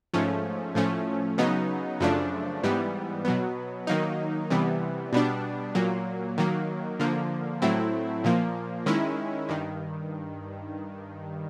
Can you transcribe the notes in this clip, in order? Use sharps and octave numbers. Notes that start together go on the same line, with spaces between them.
G#2 F3 A3 C#4
A2 F3 A3 C#4
C#3 F#3 B3 D#4
F#2 C#3 F3 A3 D4
G#2 E3 G3 B3
B2 F#3 B3
D#3 F#3 A#3 D#4
C3 E3 G3 B3
B2 G3 B3 D4
A#2 F#3 A#3
D#3 F#3 A#3
D3 F3 A#3
A2 F#3 A3 C4 E4
A#2 F3 A#3
D#3 G#3 C#4 E4
G2 D#3